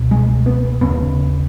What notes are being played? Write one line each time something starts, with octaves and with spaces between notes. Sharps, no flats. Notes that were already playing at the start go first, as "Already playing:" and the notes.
Already playing: C#2 B2
G#3
B3
D#2 C#3 B3